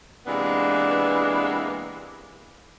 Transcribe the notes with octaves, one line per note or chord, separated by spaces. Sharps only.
C3 E3 G#3 A#3 B3 D4